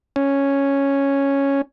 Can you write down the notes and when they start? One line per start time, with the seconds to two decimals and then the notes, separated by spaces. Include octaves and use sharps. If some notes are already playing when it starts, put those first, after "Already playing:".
0.16 C#4